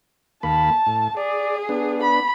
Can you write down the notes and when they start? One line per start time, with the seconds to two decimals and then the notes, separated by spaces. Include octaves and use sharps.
0.43 D#2 A#3 A5 B5
0.86 A2
1.17 G#4 D5
1.69 B3 D4
2.02 B5